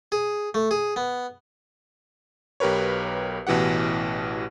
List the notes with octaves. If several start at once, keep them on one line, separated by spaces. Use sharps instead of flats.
G#4
A3
G#4
B3
B1 G4 A#4 B4 C#5
A1 B2 E3 G4 F#5